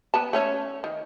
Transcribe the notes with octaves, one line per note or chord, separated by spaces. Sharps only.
B3 B4 A5
A3 C#4 C#5
D#3